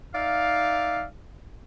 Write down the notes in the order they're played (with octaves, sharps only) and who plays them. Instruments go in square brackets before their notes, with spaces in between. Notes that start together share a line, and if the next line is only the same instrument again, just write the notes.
[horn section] D#4 D5 E5 F5